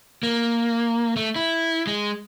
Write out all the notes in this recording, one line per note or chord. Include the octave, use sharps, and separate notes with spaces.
A#3
A3
E4
G#3